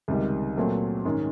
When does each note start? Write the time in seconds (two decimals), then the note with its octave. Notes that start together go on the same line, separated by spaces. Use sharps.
0.08 C#2 C3 D#3 G3
0.57 A#2 F#3 A3 C4
1.05 G#2 D#3 G#3 C#4